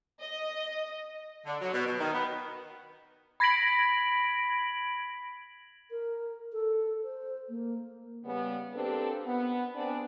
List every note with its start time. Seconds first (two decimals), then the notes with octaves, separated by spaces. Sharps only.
0.20 D#5
1.46 D3
1.61 F#3
1.74 B2
1.87 B2
1.99 D#3
2.14 B3
3.40 B5 G#6 A#6 B6 D7 F#7
5.91 A#4
6.53 A4
7.03 C5
7.49 A#3
8.25 C#3 G3 B3
8.74 A#3 C4 D4 G4 A4 B4
9.25 B3
9.74 B3 C4 D4 G#4 B4 D5